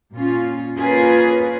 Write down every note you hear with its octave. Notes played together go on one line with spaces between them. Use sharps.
A#2 C#4 F4
A#3 C#4 F4 G#4 A#4 B4